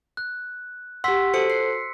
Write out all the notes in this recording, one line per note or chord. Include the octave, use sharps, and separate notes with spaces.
F#6
G4 F#5 C6 E6 B6
F#4 A4 C5 C#7
C7